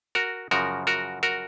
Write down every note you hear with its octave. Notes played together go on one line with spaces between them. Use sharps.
F#4 A#4
F#2 C#3 F3 F#4 A#4
F#4 A#4
F#4 A#4